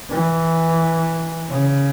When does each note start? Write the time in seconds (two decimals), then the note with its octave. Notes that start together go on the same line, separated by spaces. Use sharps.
0.10 E3
1.50 C#3